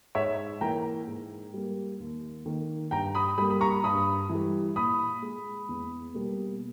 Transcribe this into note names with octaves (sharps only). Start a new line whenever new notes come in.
G#2 C#5 E5
E3 A#3 G5 A#5
G#2
G3 A#3
D#2
D#3 A#3
G2 G5 A#5
B5 D#6
G3 A#3 B5 D#6
B5
A#5 C#6
G2 B5 D#6
E3 G3
A#2 B5 D#6
G#3
E2
B2 G3 A#3